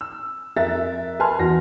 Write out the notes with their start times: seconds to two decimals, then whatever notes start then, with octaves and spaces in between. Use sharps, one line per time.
0.01 E6
0.56 F2 A#4 E5 F#6 A6
1.19 B4 G#5 A5 C6 F6
1.39 E2 F#4 A#6